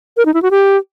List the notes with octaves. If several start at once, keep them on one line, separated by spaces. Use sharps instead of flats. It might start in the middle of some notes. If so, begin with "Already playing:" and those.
A#4
D#4
E4
F#4
G4